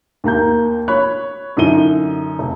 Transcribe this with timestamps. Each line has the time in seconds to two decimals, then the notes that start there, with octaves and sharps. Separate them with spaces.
0.24 D#2 A#3 A#5 G6
0.88 C#5 B5 F#6
1.57 F#2 D3 D#4 E4 D#7 G7
2.39 F1